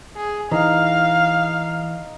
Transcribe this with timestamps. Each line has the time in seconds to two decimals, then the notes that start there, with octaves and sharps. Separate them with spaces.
0.16 G#4
0.51 E3 D#4 F5